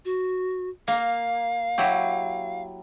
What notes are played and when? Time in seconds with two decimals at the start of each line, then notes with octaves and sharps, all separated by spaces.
0.05 F#4
0.88 A#3 F5
1.78 F#3 E4 G4